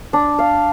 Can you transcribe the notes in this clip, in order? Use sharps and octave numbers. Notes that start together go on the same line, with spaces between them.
D4
F5